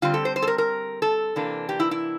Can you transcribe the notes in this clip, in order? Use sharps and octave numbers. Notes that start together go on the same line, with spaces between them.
D3 G3 C4 F4
A4
C5
C5
A4
A#4
A#4
A4
C3 E3 A#3 D4
G4
E4
E4